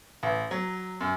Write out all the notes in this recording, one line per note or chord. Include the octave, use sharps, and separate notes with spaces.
A1
F#3
F#2